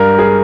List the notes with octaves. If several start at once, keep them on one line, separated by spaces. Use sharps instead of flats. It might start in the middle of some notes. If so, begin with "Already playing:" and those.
Already playing: G2 G3 A#4
G#4